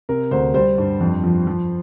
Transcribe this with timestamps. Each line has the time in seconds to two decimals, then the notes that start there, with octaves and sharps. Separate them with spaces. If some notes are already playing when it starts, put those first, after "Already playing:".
0.09 C3 A#4
0.31 D2 C5
0.54 G3 C5
0.78 G2
1.00 F2
1.24 F3
1.47 F3